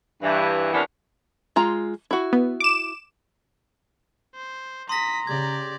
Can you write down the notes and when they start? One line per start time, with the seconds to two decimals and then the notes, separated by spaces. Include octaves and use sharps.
0.23 G2 E3
0.73 C3 E3 B3 C#4 D4 A#4
1.56 G#3 F4 A#5
2.11 E4 F#4
2.33 B3
2.60 D6 E7
4.35 C5
4.89 A#5 C6 D#6 A#6 B6
5.27 C#3 G4 D5 G#6